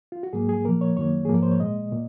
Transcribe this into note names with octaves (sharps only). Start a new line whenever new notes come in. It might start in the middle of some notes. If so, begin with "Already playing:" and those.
F4
F#4
G#2 F#3 A#3 G#4
G#4
A#2 F3 A#3 A#4
C#5
F#2 D#3 F#3 A#3 C#5
G#2 F3 A#3 G#4
A#4
C5
C#5
A#2 G#3 D#5
A#2